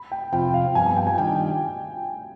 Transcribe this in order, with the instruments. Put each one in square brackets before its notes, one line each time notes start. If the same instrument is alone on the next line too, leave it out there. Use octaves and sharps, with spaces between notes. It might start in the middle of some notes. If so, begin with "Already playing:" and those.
Already playing: [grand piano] B5
G5
[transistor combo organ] F2 C3 F3 C4 F4 [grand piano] G5
[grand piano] F5
[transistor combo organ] G2 F3 B3 [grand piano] G#5
[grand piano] G#5
G5
G#5
[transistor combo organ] D#3 G3 D4 F4 [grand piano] G5
[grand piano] G#5